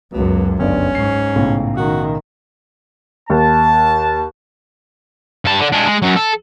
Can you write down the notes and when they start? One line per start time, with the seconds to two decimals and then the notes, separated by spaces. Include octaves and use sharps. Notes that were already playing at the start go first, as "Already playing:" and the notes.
0.13 C#2 F#2 B2
0.59 G1 G2 C#4 D5
0.95 G#2 C#6 C7
1.36 B1 A2 C#3
1.77 D#3 F#4
3.30 D#2 A5
5.45 G2 A5
5.60 D3
5.73 G#3 D4
5.87 G#3
6.02 F#2 F#3
6.16 A4